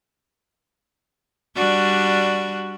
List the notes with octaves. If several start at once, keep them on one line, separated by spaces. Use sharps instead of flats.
G3 D4 F#4